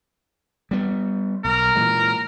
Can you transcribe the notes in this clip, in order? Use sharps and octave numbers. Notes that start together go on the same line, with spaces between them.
G3 B3
B1 A#4
A#2 E3 G#3